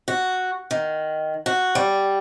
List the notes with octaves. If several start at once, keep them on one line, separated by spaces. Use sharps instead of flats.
F#4
D#3
F#4
G3